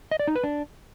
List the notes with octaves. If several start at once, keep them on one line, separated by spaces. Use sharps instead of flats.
D#5
D5
D#4
B4
D4